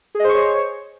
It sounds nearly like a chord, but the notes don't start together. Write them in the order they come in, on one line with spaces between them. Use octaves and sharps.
G#4 D#5 C5 C#6 C#5